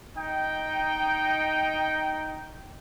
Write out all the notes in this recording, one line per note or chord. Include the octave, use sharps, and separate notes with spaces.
D#4 G5